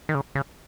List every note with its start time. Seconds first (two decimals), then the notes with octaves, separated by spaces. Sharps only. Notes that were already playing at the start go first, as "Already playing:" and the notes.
0.09 D#3
0.15 C#3
0.35 C#3